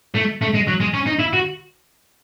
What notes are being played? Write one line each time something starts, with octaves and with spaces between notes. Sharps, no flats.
A3
A3
G#3
F#3
G#3
C#4
D#4
E4
F#4